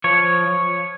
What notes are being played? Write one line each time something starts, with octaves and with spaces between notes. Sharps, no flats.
F3 C#5